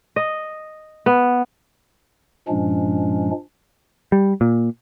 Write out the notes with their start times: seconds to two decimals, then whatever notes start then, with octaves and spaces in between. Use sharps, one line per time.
0.16 D#5
1.06 B3
2.48 G2 A#2 F3 G#3 C#4 D4
4.12 G3
4.41 A#2